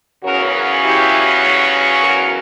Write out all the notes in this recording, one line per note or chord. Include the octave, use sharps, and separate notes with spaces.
E2 C#3 F#3 C#4 F#4 A#4
E4 G4
F#4 A#4